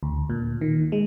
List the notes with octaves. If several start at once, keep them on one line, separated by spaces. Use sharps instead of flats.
D2
A#2
D#3
G#3